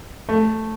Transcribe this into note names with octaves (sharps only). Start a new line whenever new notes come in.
A3